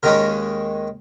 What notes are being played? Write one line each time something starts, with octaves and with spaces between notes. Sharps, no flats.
D#2 D#3 G#3 C#4 A#4